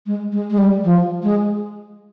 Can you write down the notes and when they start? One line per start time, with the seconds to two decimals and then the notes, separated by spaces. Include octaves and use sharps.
0.06 G#3
0.32 G#3
0.50 G#3
0.58 G3
0.84 F3
1.23 G#3